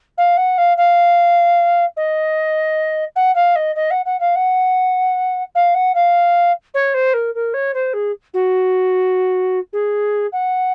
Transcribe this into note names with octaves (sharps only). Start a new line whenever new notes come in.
F5
F#5
F5
F5
D#5
F#5
F5
D#5
D#5
F#5
F#5
F5
F#5
F5
F#5
F5
C#5
C5
A#4
A#4
C#5
C5
G#4
F#4
G#4
F#5